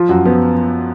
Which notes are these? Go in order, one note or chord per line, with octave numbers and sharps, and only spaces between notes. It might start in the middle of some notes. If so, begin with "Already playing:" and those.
Already playing: F3 F4
F#2 F#4
F3 B3